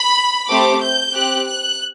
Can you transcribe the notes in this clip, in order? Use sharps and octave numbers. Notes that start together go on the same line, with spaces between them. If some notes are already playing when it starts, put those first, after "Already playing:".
Already playing: B5
A3 C4 G4 D6
G6
C4 G4 F#6
F#6